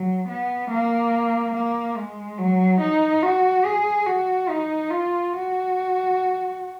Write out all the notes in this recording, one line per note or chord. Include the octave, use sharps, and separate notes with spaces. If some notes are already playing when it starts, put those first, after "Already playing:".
Already playing: F#3
B3
A#3
A#3
G#3
F#3
D#4
F#4
G#4
F#4
D#4
F4
F#4